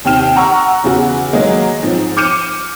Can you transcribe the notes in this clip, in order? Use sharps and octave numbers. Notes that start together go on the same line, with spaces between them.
D#2 C3 G5 F6 E7
F#5 A#5 C#6 E6
E2 C#3 F#4
D#3 F#3 G#3 A#3 D#4
G#2 F3 C4
D6 F6 G6 C#7 D#7 E7